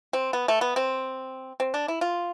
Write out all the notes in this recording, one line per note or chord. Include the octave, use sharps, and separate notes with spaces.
C4
B3
A3
B3
C4
C4
D4
E4
F4